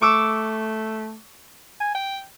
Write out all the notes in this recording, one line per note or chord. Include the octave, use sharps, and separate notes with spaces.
A3 C#6 D6 E6
G#5
G5